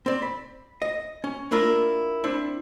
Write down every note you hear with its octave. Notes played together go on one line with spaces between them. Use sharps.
C4 D5
B5
D#5
C#4
A#3 D4 E4 F4 A#4
C4 D4 E4